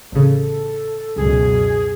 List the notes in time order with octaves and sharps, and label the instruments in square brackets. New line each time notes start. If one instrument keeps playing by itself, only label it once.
[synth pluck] A1 C#3 [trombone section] A4
[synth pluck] C#2 [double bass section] F#2 B2 [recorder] G#4